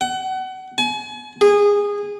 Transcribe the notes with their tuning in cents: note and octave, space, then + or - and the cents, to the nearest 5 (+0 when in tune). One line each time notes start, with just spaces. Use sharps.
F#5 +30
G#5 +35
G#4 -20